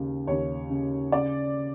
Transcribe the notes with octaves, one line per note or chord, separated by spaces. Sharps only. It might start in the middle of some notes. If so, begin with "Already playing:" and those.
Already playing: D#2 C#3
D#2 C#5
C#3
C#3 D5